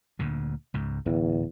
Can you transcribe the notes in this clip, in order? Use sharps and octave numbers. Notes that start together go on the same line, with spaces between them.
D2 A#2 D3
C#2 G#2
D1 E2